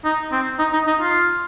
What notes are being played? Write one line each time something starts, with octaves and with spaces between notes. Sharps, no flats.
D#4
C4
D#4
D#4
D#4
F4